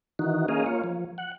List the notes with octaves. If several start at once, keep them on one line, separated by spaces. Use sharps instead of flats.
D#3 E3 D#4 F#4
A#3 C#4 G#4 D#5 F5
A#3 F4 C#5
F3
F#5